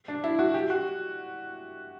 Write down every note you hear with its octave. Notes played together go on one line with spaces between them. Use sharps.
D4
E4
F#4
G4
F#4